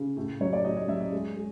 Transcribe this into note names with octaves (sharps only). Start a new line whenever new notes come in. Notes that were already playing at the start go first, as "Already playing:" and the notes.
Already playing: C#3
A2
F#3 C#5
D5
A2 D#5
D#5
F#3 E5
D#5
G#3
G#3